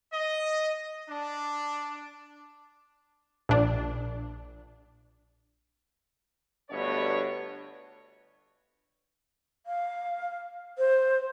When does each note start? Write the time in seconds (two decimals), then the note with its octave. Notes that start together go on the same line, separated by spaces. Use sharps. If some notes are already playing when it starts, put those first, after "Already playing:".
0.13 D#5
1.09 D4
3.49 A#1 D4
6.70 G1 D2 B2 B3 D4 C#5
9.66 F5
10.78 C5